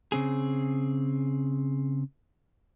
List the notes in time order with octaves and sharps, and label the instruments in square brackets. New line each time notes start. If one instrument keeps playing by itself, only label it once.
[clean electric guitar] C#3 C4 G#4